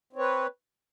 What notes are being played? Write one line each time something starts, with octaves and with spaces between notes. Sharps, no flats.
C4 B4 C#5